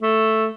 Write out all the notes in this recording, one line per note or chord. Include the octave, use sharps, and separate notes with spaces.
A3